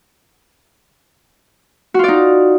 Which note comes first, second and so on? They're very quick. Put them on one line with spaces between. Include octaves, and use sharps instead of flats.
F#4 F4 D5 D#4